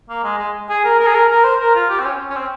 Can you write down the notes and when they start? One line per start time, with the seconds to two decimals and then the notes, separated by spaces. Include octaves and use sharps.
0.09 A#3
0.24 G#3
0.39 G#3
0.70 G#4
0.84 A#4
1.00 A#4
1.07 G#4
1.15 A#4
1.30 A#4
1.44 C5
1.60 A#4
1.75 F4
1.89 G4
2.00 C4
2.05 C#4
2.30 C#4
2.36 C4